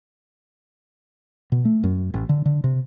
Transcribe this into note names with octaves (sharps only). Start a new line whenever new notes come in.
B2
A3
F#2
A1
D3
D3
C3